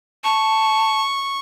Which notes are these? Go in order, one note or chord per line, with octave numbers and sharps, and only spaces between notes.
A5 C#6